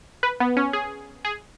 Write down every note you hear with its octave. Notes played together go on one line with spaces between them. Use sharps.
B4
B3
C#4
G#4
G#4